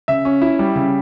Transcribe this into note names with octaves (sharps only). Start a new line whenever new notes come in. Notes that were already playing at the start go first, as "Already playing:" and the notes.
C#3 E5
C#4
E4
G3
C#3